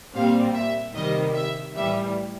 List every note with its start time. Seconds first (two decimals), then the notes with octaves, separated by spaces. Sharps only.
0.15 A#2 G3 C4 F5
0.55 E5
0.95 C3 D#3 G3 D#5
1.36 E5
1.76 A2 E3 G3 E5